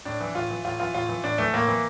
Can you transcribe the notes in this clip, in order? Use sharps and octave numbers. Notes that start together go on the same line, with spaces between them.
A2 D4
E3
A2 F4
E3
A2 F4
E3 F4
A2 F4
E3
A2 D4
E3 A3
A2 A#3
E3